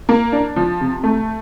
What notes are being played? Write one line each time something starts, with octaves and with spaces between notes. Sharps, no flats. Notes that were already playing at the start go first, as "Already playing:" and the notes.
A#3
D4
F3
C3
A3